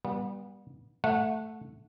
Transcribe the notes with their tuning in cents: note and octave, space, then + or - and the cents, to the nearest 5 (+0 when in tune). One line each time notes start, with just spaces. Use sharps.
G3 +15 B3 -30
A3 +0 F#5 -20